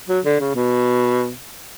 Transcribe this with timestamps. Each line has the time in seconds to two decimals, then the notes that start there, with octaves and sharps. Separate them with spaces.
0.09 F#3
0.25 D3
0.40 C#3
0.55 B2